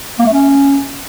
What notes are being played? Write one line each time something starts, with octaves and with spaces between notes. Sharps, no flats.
A#3
A3
C#4